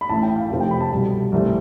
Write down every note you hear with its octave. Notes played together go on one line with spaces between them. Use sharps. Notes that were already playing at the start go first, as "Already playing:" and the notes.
B5
A1 A2 E3 A5
G5
F5
F2 C3 F3 A3
G5
B5
A5
C2 B2 G3
C2 C3 E3 A3 C4